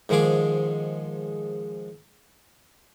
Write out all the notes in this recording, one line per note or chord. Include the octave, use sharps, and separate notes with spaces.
G#2 D#3 F3 G#3 G#4 D6